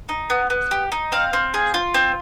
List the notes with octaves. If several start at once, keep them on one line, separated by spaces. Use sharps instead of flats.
D#4
B3
B3
G4
D#4
C4 F5
C4
G#4
F4
C4